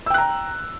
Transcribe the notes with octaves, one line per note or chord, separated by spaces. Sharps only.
G5 A#5 E6 F#6